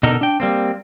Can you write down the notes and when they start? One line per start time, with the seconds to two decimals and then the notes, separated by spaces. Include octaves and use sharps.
0.03 B2 D3 D#4 A4 A#4
0.21 D4 G5
0.40 G3 A#3 C4